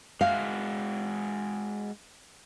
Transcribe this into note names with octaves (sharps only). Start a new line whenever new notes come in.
G#3 F#4 F5